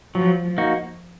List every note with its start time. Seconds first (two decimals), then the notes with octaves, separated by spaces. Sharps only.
0.15 F3 F#3
0.44 F3
0.58 A#3 D#4 F#4